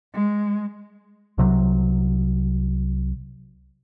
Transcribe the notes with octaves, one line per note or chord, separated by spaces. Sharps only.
G#3
C2 C3 F#3